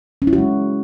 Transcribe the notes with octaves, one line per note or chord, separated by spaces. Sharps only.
C#4
E4
F#4
G#3